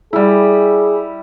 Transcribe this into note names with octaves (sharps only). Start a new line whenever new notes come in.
G3 E4 G#4